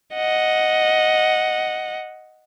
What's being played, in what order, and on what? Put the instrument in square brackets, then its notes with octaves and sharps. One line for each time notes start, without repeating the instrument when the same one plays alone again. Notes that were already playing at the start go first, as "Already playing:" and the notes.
[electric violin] D#5 F#5